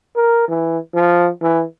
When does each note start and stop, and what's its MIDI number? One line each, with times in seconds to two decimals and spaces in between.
0.16 0.45 70
0.48 0.78 52
0.94 1.30 53
1.42 1.63 52